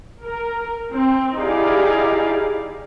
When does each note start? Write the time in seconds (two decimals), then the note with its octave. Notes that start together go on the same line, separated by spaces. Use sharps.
0.24 A#4
0.91 C4
1.37 D#4 E4 G4 G#4 D5 F5